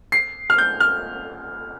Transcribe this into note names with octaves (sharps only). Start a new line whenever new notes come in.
C7
F6
G6
F6